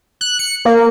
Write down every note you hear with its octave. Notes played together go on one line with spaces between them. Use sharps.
F#6
C#7
A#3